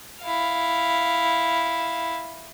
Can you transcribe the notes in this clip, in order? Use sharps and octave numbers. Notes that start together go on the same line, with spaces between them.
E4 F5